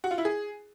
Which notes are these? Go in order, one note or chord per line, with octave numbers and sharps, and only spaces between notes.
F#4
F4
E4
G#4